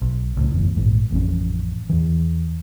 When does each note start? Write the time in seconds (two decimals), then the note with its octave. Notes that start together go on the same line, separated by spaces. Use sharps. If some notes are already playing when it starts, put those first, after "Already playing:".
0.01 B1
0.37 C#2 A2
0.52 F#1 E2
0.76 A#1 G#2
1.11 A1 F2 C#4
1.89 E2 E3